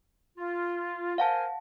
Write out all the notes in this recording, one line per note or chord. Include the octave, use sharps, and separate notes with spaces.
F4
A#4 C5 F5 F#5 G#5 A5